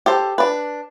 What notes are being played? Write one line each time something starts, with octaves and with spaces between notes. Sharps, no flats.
G4 A4 C5
D4 B4